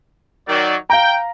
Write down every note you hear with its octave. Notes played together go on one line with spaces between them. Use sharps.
D#3 F#3 D5
F5 G5 A#5